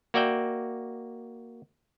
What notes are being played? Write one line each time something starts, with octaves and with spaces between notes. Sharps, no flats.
A#3 F#4 D5 E5 G5